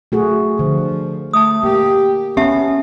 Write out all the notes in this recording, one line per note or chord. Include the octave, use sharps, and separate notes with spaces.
A3 F#4 G#4
D3 F3
A3 A5 D#6
A#3 G4
B3 C#4 G4 E5 A5